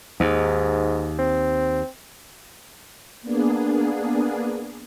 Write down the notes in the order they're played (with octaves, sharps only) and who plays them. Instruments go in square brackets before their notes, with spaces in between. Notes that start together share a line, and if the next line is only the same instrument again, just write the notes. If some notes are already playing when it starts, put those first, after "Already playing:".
[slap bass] D#2 [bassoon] G#2
[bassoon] C4
[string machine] A#3 B3 D4 G#4